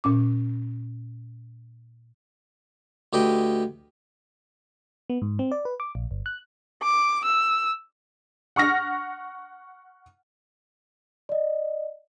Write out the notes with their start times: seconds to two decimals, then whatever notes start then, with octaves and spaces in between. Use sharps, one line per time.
0.04 A#2 C#4 D6
3.13 D2 G4 B4 D#5 G5
5.10 B3
5.22 G#2
5.39 C4
5.52 D5
5.65 B4
5.80 D6
5.95 A#1
6.11 G1
6.26 F#6
6.83 D6
7.24 E6
8.56 F#5 C#6 F6 A#6
11.29 D5 D#5